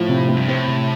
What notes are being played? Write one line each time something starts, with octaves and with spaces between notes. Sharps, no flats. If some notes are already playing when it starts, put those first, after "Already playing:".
Already playing: A2 F3
C3
C4
G2
A2 C4
C3